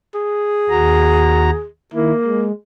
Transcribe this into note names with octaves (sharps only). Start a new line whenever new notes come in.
G#4
D#2 F#4 A#5
D#3 A#3 E4
G#3